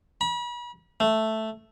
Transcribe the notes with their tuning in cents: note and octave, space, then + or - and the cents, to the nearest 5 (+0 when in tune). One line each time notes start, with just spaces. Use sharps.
B5 -40
A3 +0